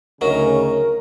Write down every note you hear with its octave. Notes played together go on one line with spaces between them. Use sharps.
D2 C#3 F#3 D#4 A#4